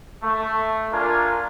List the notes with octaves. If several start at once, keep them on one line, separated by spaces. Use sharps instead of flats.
A3
A#3 D4 F4 A#4 G#5